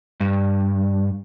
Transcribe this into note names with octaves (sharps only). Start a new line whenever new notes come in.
G2